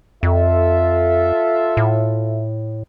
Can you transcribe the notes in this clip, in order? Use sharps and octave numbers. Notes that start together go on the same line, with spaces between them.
F2 F4 A4 E5
A2